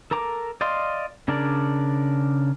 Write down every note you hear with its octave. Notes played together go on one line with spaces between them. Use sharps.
A4 A#4 A#5 D6
D5 D#5 F5 C6
C#3 D4 A#4 D5